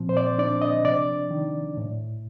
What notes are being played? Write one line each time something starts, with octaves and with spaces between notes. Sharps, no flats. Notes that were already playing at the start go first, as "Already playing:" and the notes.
Already playing: A#2 F3 C4
C5
D5
D4 D5
D#5
C3 D5
D#3
A2